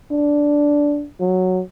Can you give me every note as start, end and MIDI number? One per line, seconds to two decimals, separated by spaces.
0.11 1.06 62
1.20 1.62 54